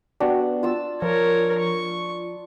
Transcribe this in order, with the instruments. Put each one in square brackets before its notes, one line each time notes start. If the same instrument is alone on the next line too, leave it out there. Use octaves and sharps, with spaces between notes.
[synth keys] B3 F#4 G4 [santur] D4
[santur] F4 A5 E6
[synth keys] F3 [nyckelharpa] A#4 C#5
[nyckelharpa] C#6